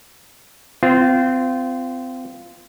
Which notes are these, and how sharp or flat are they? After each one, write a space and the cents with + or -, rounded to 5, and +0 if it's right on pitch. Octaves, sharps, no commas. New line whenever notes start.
C4 -30 F4 -10